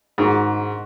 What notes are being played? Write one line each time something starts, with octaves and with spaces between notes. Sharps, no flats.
G#2 D#3 G#3 D#4 F#4